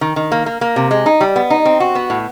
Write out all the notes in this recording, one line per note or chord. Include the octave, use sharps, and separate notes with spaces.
D#3
D#3
A#3
A#3
A#3
C3
G#3
D#4
G3
B3
D#4
C4
F#4
B3
A2